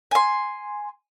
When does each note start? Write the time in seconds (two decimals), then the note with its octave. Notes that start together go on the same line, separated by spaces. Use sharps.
0.11 G#5 C6